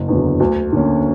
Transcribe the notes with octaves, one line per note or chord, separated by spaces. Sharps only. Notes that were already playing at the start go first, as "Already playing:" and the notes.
Already playing: F#1
E2 D3 F#3
D2
D3 A#3 C#4